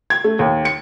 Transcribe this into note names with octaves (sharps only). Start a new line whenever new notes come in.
G#6
A3
D#2
C#7